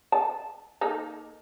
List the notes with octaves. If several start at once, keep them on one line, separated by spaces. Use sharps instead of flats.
A5
A#3 D#4 A4